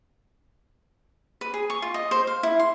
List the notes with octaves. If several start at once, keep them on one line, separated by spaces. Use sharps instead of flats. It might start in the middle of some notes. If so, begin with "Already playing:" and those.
B4
G#4
C#6
F4
D#5
C5
F5
E4
C6